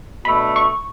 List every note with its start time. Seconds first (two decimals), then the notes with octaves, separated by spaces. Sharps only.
0.25 B2 A3 D4 B5
0.56 C#6